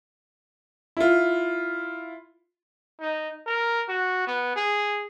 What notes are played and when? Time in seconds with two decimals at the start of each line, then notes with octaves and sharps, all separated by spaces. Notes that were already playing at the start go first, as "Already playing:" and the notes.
0.97 E4 F4
3.00 D#4
3.46 A#4
3.88 F#4
4.27 B3
4.56 G#4